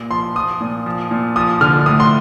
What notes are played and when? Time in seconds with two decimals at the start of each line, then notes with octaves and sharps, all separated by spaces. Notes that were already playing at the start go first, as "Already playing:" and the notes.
Already playing: A#2
0.10 F3 C6
0.36 F3 D#6
0.61 A#2
0.86 F3
1.11 A#2
1.36 F3 D#6
1.61 D3 F6
1.86 A2 D#6
2.00 C6